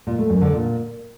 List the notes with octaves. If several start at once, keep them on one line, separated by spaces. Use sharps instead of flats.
A#2
A3
F#2
D3
A#2